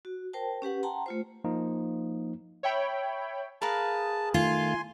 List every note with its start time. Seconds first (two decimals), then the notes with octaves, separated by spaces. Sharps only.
0.05 F#4
0.33 A#4 C5 G5 A5
0.62 C#4 G4 B4 F#5
0.83 F#5 G5 A5 A#5 C6
1.06 A3 F4 C5
1.44 F3 A#3 D#4
2.63 C#5 E5 G5 B5
3.62 G#4 A#4 B4 F5 A5
4.34 D#3 A3 F4 G#5 C6